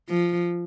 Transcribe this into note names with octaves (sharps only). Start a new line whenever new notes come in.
F3